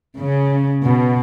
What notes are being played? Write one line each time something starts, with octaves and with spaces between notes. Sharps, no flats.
C#3
B2